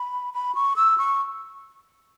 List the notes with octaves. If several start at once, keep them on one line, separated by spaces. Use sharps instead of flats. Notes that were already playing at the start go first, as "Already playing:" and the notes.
Already playing: B5
B5
C#6
E6
C#6